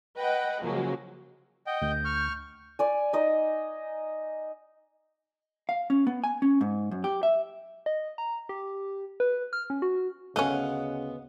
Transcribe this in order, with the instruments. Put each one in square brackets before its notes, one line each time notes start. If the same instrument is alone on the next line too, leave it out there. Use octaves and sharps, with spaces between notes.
[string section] B4 D#5 F#5 G5
C#3 F3 F#3 G#3 A#3
[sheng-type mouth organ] D#5 G5 [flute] F#5
[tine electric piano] D2 [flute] G6
[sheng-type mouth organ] C#6 F6
[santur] D5 G#5
D#4 D#5
[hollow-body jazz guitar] F5
C#4
B3
G#5
C#4
G#2
F#2
G4
E5
[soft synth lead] D#5
A#5
G4
B4
F6
C#4
F#4
[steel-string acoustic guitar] D2 B3 [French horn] C#3 [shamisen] A3 C#4 [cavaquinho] D#5 F5 F#5